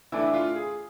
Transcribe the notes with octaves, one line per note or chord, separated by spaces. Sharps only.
E3 A3 D4 E4
F4
G#4